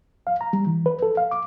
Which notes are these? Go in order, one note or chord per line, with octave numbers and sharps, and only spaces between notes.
F5
A#5
G3
E3
B4
A4
F5
D6